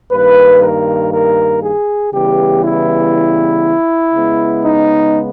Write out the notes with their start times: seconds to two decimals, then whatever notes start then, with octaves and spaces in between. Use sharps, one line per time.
0.12 G2 D#3 A#3 B4
0.62 A#4
1.12 A#4
1.63 G#4
2.13 C#3 E3 G3 B3 G4
2.63 E4
4.14 C#3 G#3 B3
4.64 D#4